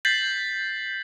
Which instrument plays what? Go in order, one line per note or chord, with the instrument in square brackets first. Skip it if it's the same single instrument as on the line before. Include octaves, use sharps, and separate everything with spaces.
[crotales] G6 A6 B6 C7 F#7